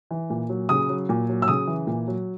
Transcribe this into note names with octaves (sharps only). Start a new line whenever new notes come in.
E3
A#2
F#3
C#3 D#6
F#3
A#2
F#3
E6
C#3 D#6
E3
A#2
F#3